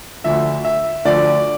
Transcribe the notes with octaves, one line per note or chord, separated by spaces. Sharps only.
D2 D3 F3 E5
E5
D2 D3 F3 D5